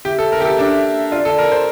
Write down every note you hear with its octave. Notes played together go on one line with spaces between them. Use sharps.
G4 E5
A4
A#4
G4
A4
D4
F4 D5
A4
A#4
C5